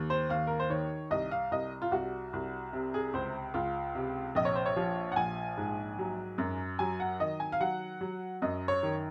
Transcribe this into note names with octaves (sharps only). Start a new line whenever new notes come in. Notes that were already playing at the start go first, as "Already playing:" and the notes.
Already playing: D#2
C5
D#2 F5
A#4
C5
D#3 C#5
C2 D#5
F5
C2 D#5
F4
C2 F#4
C2
C3
G#4
C#2 C5
C#2 F4
C3
A#1 D#5
C#5
C5
C#5
F3
F#5
A#1 G#5
G#2
F#3
F#2
F#3 G#5
F#5
D#3 D#5
G#5
F5
F#3 F#5
F#3
F#2 D#5
C#5
D#3